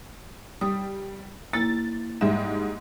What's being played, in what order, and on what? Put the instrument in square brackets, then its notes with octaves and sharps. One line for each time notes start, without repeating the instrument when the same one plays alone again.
[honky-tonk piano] G3 [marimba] D#6
[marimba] A#3 E4 [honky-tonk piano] A6
[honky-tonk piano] G#2 G3 G#3 [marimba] E5